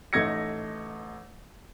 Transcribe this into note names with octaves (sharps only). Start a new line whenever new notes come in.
A1 A3 D#4 G#6 A#6 C#7